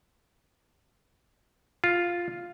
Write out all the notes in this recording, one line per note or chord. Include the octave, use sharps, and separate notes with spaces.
F4